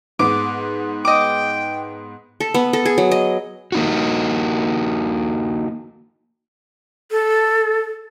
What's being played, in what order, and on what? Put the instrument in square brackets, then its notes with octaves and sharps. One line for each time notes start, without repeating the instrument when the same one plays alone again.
[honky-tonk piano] G#2 B3 [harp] D6
[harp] D#5 D6 [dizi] G5
[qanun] A4
B3
A4
G#4
F#3
D#5
[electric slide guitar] A#3 D#4 F#4
[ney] A4